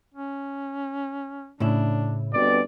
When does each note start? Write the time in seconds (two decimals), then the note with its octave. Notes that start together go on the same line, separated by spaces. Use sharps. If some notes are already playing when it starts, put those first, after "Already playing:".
0.14 C#4
1.60 A2 C#3 D4 E4
2.33 G1 B2 C4 D5